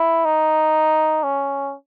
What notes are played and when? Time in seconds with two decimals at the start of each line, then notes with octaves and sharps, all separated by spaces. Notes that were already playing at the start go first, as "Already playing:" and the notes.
Already playing: E4
0.25 D#4
1.23 C#4